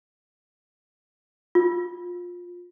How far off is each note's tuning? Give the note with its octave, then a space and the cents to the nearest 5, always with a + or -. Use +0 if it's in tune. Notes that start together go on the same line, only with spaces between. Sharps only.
F4 +20